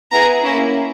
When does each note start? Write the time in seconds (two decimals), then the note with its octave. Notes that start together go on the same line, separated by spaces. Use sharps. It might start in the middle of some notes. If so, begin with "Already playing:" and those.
0.12 B3 E4 G#4 A#5
0.45 A#3 C#4 E4